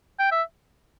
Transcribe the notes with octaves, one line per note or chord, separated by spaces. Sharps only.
G5
E5